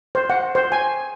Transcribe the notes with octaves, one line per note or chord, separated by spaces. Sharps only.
C5
F#5
C5
G#5